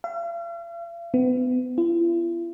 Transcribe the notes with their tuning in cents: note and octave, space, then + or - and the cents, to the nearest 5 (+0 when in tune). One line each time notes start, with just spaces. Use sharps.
F5 -45
B3 +35
E4 +45